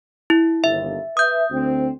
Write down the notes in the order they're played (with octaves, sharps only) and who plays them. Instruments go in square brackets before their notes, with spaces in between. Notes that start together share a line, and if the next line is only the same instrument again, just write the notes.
[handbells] E4
[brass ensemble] G1 D#2 [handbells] E5
[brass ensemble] B4 E5 [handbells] D#6 G6
[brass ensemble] D2 C4